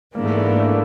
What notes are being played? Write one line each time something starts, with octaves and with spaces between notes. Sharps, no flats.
G#2 E3 G#3 A#3 B3 D4
A3
A#3
A#3
A3